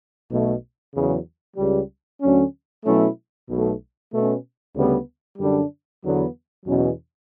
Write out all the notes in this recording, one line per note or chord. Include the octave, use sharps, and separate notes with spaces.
B1 B2 A3
E2 C#3 F#3
C#2 C#3 G3
D2 D3 F#3 C#4
B2 F#3 A3 C#4 E4
B1 B2 A3
B2 A3 C#4
D2 C#3 G3 B3
F#2 D3 G3 D4
E2 D3 F#3 B3
E2 B2 F#3 C#4